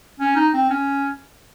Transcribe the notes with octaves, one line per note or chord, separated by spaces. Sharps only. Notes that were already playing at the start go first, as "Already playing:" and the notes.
C#4
D#4
C4
C#4